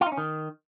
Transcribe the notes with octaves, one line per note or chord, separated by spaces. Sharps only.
F4
D#4
C#4
D#3